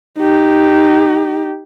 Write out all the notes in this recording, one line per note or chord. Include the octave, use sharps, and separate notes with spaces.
D#4 G4